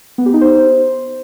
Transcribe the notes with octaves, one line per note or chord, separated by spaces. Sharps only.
B3
G4
D#4
C5